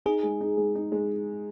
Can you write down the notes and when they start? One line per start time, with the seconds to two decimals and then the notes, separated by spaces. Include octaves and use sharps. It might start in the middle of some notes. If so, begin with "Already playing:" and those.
0.06 D#4 G#4
0.23 G#3
0.40 D#4
0.57 G#3
0.75 D#4
0.92 G#3